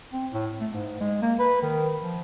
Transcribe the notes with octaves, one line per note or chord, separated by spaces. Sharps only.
C4
A2
A3
G#2
G#3
A#3
B4
D#3
F3